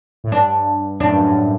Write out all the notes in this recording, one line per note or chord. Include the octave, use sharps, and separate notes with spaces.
A2
G2 D4
F#2 A2 D4
G2
F#2